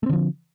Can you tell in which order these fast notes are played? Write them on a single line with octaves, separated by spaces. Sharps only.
A3 C4 D3 F3